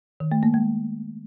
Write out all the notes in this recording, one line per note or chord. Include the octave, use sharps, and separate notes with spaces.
D#3
A3
A#3
G#3